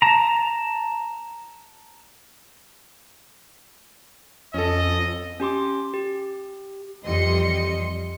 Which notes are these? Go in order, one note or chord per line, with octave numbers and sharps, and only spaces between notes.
A5 A#5
F2 C#4 A4 D#5
C#4 G4 C6 D6
G4
F2 E3 G3 D#5 C6 C#7